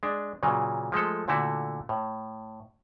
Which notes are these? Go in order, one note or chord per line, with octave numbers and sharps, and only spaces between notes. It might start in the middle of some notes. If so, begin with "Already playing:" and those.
G#3 D4
A#2 C#3 E3 F#3
F3 G#3 A3 A4
A#2 D3 A3 E4 F#4
A2